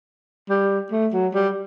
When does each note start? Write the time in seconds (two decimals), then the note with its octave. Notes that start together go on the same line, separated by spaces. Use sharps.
0.49 G3
0.92 A3
1.13 F#3
1.34 G3